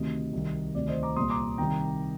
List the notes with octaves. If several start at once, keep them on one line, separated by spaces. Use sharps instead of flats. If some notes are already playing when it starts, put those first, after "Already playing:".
Already playing: D2 C3 D#3 D#5
C2 C3 D#3
D2 C3 D#3 D5
C5 D#5
A#5 D6
C2 A#2 C6 D#6
A#5 D6
C2 C3 D#3 G5 A#5